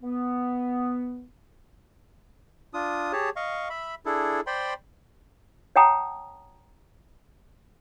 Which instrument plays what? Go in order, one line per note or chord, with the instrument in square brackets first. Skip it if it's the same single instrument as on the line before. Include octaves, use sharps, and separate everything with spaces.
[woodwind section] B3
[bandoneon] D4 F4 D#6
G4 G#4 C#5 A5
D#5 F5 C#6
E5 B5
D4 E4 G#4 A4
C5 D5 G5 B5 C6
[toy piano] C#5 F#5 G5 A5 A#5 D#6